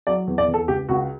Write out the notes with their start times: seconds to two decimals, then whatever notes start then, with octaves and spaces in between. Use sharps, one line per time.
0.07 F#3 D5
0.27 E2
0.38 D5
0.48 E2
0.54 A4
0.68 C#2 G4
0.89 C#2 F#4